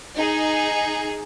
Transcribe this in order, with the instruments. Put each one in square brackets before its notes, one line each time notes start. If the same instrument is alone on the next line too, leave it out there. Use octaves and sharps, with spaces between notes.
[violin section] D#4 G#4